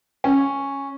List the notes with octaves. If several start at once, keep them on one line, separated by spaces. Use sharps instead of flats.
C#4